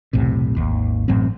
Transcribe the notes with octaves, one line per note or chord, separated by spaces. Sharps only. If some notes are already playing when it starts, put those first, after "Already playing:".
B1 E2 A2 C3
G#1 D#2
A1 F#2 A2 C4